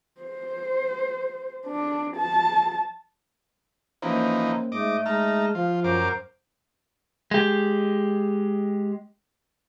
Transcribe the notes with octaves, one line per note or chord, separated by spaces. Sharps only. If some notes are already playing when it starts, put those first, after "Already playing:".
C5
D4
A5
E3 F3 A#3 C#4 D#4 C5
G#2 A3 D#5 D6
G#3 D#4 A5 A#5 F6
F3 F4
F#2 A#4 C5 D6
G#3 G4